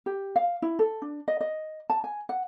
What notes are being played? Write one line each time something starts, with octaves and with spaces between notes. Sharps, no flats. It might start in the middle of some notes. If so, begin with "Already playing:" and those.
G4
F5
E4
A4
D4
D#5
D#5
A5
G#5
F#5